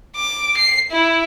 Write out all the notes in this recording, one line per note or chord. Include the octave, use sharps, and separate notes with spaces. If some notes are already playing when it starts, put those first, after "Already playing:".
D6
C7
E4